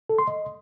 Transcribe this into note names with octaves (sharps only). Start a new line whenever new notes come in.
A4
C6
D#5